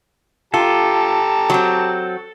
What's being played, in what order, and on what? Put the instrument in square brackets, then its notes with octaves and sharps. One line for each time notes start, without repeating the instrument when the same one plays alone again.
[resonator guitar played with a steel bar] F4 [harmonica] G4 A5 A#5 [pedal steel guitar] A4
[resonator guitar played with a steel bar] F#3 C4